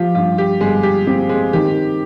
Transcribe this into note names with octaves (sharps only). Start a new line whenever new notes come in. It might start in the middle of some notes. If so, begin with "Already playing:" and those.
Already playing: F3 F4 G4
G2 F4
G4
G1 G#3 G#4
G4
C4 G4
G#3 G#4
D#3 G4